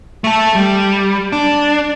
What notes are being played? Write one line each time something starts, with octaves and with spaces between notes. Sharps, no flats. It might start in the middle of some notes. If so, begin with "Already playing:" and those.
A3 A4
G3
D4